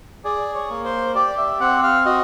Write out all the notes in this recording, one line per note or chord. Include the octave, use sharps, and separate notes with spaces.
G#4 D5
C#5
A#3
C5
G4 D5
E5
C4 F#5
F5
F#4 D#5